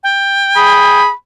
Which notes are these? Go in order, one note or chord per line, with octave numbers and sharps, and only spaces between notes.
G5
G#4 B5